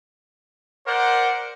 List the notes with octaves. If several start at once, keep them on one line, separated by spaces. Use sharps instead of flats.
A#4 C5 D5 F#5